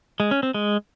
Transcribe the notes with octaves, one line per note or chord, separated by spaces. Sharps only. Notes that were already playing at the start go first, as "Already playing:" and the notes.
G#3
C#4
C4
G#3